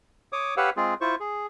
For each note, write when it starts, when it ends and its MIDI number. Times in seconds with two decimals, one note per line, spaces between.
0.32 0.55 73
0.32 0.55 86
0.32 0.55 87
0.57 0.70 67
0.57 0.70 71
0.57 0.70 73
0.57 0.70 77
0.57 0.70 78
0.57 0.70 88
0.77 0.94 56
0.77 0.94 60
0.77 0.94 65
0.77 0.94 68
1.01 1.15 64
1.01 1.15 65
1.01 1.15 72
1.01 1.15 85
1.20 1.47 68